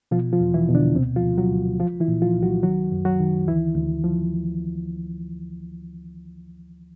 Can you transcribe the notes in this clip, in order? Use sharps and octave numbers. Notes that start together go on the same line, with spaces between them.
B2 F3 F4
F3 F4
E2
E3 E4
B2
D3 D4
D2 C3 C4
F3 F4
D2
F#3 F#4
D2
F3 F4
E3 E4
A#2
F3 F4
C2
F#3 F#4
D#3 F#3 F#4
F#2
F#3 F#4
D#3
D2 E3 E4
D2
F3